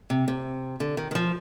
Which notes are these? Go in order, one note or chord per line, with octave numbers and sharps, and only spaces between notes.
C3
C3
D3
D#3
D#3
F3